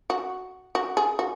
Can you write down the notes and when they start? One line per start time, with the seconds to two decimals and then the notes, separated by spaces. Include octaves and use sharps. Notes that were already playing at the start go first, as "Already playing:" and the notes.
0.10 F#4
0.75 F#4
0.97 G#4
1.19 F#4